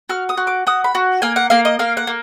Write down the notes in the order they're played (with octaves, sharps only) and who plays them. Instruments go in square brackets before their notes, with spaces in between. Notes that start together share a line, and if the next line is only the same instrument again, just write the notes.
[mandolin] F#4 F6
D#6
F#4
D6
F#4 D#6
B5
F#4
A#3 G#5
F#5
A#3 F5
D#5
A#3 F5
F#5
A#3